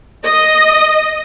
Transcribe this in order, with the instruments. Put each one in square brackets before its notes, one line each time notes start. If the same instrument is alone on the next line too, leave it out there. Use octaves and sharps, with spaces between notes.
[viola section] D#5